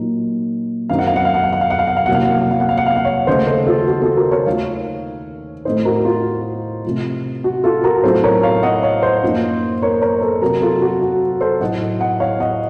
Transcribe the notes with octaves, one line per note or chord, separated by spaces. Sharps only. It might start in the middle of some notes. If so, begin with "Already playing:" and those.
Already playing: A#2 F#3 A#3 D#4
F#2 D#3 F#3 C4 D#4 F5
F#5
F5
F#5
F5
F#5
F5
F#5
F5
F#5
F5
F#5
F5
C2 C3 F#3 A#3 F#5
F5
F#5
F5
F#5
F5
F#5
F5
F#5
F5
F#5
C#5 F5
D#2 C#3 A3 C5 D#5
A4 C5
F4 A4
F#4
F4 A4
F#4 A#4
A#4 C#5
D#2 D#3 A3 C#5 F5
A2 A3 C4 D#4 C5 D#5
F#4 A#4
F4
C3 F3 A3
F#4
F4 A4
F#4 A#4
A2 F#3 C4 D#4 A4 C5
A#4 C#5
C#5 F5
D#5 F#5
C#5 F5
C5 D#5
F#2 F3 A#3 D#4
A#4 C#5
A#4 C#5
A4 C5
C3 F#3 C4 F#4 A#4
F4 A4
F#4
F#4
A4 C5
A2 F#3 A3 D#4 D#5 F#5
D#5 F#5
C#5 F5
D#5 F#5